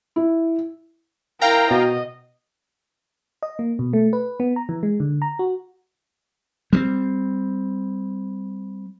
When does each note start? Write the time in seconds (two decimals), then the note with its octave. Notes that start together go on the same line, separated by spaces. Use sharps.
0.16 E4
1.41 E4 A#4 F5 G5 A#5
1.71 B2 F#4 D#5
3.43 D#5
3.59 A#3
3.79 B2
3.93 A3
4.13 B4
4.40 B3
4.56 A#5
4.69 E3
4.83 G#3
5.00 D3
5.22 A#5
5.39 F#4
6.73 G3 A3 C4